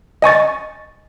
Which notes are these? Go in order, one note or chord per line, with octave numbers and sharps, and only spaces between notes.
D#5 G#5 C#6 A6